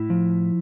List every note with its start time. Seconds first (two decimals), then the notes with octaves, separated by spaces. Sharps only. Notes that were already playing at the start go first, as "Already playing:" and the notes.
Already playing: A2 E4
0.10 F3